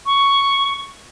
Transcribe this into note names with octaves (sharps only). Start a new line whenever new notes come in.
C#6